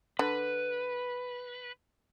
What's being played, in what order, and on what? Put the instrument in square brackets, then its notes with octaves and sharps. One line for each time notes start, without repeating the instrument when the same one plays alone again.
[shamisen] D3 [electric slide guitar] B4